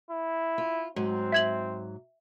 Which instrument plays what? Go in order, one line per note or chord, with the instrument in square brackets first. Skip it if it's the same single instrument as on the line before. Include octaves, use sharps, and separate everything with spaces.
[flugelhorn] E4
[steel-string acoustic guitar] F4
[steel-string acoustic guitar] G#2 F#3 [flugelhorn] C4
[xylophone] E5 G#6 F#7